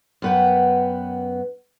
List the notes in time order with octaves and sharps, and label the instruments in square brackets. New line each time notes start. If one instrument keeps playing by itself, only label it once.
[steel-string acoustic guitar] F#2 B3 B4 F#5 G5